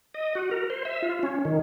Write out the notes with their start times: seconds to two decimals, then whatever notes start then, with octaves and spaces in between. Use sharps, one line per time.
0.14 D#5
0.35 F#4
0.51 A#4
0.70 C5
0.85 E5
1.02 F4
1.23 C#4
1.45 D#3